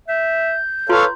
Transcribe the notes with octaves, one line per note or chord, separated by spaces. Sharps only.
E5 G6
F4 A4 B4 C#5 F5 C6